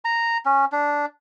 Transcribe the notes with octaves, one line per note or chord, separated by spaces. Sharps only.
A#5
C#4
D4